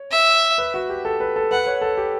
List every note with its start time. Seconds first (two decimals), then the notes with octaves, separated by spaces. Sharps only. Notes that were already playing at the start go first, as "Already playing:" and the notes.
Already playing: C#5
0.11 E5
0.58 B4
0.74 F#4
0.89 G4
1.05 A4
1.20 B4
1.36 A4
1.51 B4 F#5
1.67 C#5
1.81 A4
1.97 G4